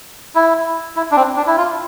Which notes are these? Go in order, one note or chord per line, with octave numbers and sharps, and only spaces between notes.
E4
E4
D4
C4
D4
E4
F4